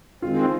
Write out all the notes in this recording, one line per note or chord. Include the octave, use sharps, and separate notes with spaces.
D#3 G#3 C4 F4